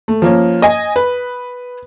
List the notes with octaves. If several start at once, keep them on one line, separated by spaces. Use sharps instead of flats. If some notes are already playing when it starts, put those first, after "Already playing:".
A3
F3 A#3 C#4
D#5 G#5
B4